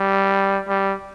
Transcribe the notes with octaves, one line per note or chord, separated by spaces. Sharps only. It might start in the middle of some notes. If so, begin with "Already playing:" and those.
Already playing: G3
G3